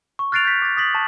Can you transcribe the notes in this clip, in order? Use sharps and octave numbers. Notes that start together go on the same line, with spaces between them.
C#6
F6 F#6 A6 C7 D7 F7
G6 B6
D6 A6
D#6 A6 B6 F#7
A5 C#6